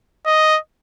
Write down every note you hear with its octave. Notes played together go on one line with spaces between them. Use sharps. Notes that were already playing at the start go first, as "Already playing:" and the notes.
D#5